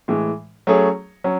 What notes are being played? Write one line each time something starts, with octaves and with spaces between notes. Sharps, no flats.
A2 E3 G#3
F#3 A3 C#4 G#4 C#5
F#3 C#4